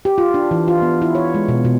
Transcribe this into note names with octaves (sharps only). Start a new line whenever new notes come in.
G4
F4
D4
E3
F4
B3
E4
C#5
G#3
B2
B2